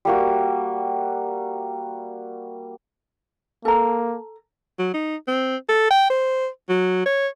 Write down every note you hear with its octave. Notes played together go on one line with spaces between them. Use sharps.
G3 A#3 F#4
A#3 A4 A#5
F#3
D#4
C4
A4
G5
C5
F#3
C#5